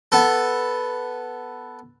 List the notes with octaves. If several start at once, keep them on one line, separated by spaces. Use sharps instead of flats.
B3 A4